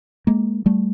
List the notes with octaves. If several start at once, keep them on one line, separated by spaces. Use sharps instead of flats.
G#3 A#3
G3 A3